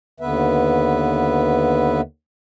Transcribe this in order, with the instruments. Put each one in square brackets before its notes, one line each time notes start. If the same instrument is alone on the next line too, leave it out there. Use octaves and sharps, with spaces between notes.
[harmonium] D#2 D3 B3 B4 E5